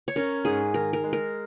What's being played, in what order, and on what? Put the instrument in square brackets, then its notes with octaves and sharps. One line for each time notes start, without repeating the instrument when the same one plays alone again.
[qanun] C#5
[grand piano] C#4 [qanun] A#4
[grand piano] G#2 [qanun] G#4
[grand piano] D#3 [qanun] A#4
[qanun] A#4
[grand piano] G#3
[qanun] A#4